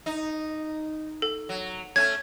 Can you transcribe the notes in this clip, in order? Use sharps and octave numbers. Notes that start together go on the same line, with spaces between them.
D#4
A4
F#3
A3 C#4 G#6